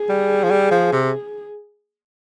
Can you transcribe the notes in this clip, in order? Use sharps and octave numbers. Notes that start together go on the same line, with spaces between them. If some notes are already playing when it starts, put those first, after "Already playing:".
Already playing: G#4
G3
F3
G3
F3
C3